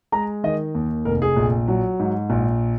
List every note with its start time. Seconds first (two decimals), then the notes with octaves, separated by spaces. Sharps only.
0.12 G#3 A#5
0.44 D#3 D#5
0.75 D#2
1.05 F1 A#4
1.22 G#4
1.36 A#1
1.68 F#3
1.99 G#2
2.30 A#1